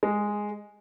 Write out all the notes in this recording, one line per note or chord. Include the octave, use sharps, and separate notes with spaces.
G#3